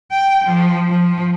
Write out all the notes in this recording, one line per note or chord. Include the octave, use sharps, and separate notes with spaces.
G5
F3
F3